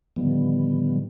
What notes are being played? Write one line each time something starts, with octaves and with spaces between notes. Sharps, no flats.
A2 D3 D#3 F3 G3 B3